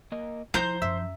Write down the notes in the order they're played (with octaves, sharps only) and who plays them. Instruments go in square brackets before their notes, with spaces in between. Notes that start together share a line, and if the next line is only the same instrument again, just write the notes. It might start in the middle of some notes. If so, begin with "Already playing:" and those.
[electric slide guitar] A#3 A#4 D#5
[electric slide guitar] F3 [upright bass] E4 [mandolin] C5 G6 [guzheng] A#5
[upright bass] F#2 [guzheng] E5